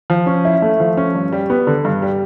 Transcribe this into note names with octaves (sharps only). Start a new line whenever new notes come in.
F3
C#4
E4
A3
F3
C#4
G2
G3
B3
D3
G2
G3